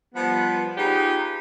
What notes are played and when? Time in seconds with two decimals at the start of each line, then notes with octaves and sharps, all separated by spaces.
0.15 F3 G3 B3
0.78 D#4 F4 G4 G#4 B4